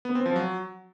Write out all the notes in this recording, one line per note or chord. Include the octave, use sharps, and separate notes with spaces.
B3
C4
F3
F#3